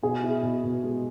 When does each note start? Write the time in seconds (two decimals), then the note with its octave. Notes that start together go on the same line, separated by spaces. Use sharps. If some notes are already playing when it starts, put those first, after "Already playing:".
0.03 B2 G#4
0.23 E4
0.43 B2
0.64 B2
0.84 G#3